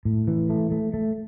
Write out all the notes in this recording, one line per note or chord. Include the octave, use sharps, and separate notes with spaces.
A2
E3
A3
A3
A3